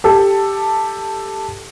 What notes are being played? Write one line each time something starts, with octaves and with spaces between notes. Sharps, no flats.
G4 A4